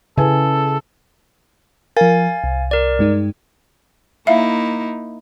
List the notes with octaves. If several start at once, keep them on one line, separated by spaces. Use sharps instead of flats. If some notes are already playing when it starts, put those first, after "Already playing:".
C#3 E4 A4 B4 G#5
F3 A#4 F5 G#5 A6
C2
A#4 D5
G2 G#3 D#4
A#3 D#4 E4 E5 F5